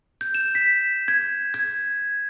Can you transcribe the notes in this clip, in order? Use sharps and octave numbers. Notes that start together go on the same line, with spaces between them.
G6
E7
B6
G#6
G#6